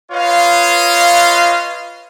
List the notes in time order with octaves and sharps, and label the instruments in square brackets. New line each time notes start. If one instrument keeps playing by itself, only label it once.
[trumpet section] F4 B4 C#5 D#5 F5